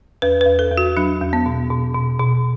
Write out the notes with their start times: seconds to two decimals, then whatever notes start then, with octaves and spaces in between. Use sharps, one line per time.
0.22 E2 B4
0.41 B4
0.46 E2
0.59 A4
0.71 E2
0.78 F#4
0.97 F#3 D4
1.21 E2
1.33 B3
1.46 B2
1.70 B2
1.95 B2
2.20 B2